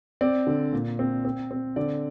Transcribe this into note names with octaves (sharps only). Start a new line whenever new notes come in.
C4 D5
D3
A#2
C4
C4
C4
D3 D5